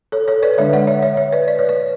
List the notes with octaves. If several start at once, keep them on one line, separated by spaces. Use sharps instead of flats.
A4 C#5
A4 C#5
B4 D5
D3 G#3 D4 C#5 E5
D5 F#5
C#5 E5
C#5 E5
C#5 E5
B4 D5
D5
C#5
B4 D5